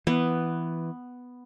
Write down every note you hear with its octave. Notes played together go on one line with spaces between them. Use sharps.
E3 B3